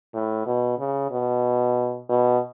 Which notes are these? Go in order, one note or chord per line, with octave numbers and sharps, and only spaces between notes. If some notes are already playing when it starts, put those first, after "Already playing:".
A2
B2
C#3
B2
B2